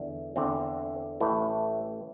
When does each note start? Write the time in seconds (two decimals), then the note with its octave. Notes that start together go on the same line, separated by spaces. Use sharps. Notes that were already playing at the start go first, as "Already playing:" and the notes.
Already playing: E2 D3
0.36 E2 D3 C4
1.20 A1 A2 E3 A3